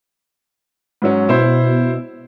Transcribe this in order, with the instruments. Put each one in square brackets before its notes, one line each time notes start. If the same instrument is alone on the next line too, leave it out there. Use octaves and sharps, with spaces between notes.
[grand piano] G#2 F#3 C#4
[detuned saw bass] B2 [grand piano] E4 C5